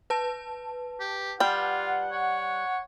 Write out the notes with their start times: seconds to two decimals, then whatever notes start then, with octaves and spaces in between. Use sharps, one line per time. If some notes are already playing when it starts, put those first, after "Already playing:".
0.10 B4 A5
1.00 G4
1.40 G3 F4 F#5 G5
2.11 C#5